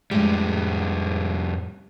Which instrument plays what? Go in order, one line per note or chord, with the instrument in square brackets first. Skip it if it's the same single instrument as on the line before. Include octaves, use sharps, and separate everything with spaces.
[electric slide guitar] F2 G3 [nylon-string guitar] A2 G#3